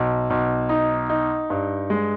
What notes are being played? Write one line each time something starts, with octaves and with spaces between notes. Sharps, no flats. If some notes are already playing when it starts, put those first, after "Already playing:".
Already playing: B1
B1
D#4
D#4
G2
G#3